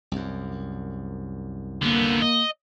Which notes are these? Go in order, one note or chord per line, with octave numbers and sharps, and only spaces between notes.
C2 F#2
D3 A#3 B3
D#5